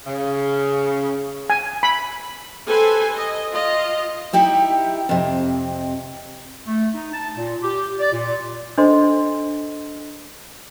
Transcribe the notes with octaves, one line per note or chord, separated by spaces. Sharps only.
C#3
G#5
B5
G4 A4 B4 C5 G#5
D#5
F4 D#5
D#4 E4 G4 E5
F2 C3
A3
D#4
A5
A#2
G4
D5
A#2
D4 A4 C5 D#5 C6